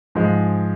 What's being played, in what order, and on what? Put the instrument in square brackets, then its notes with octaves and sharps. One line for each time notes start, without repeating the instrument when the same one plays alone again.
[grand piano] G#2 F3 G#3